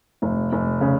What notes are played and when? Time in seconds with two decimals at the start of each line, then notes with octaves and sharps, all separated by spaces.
0.22 F1
0.52 F1
0.81 C#3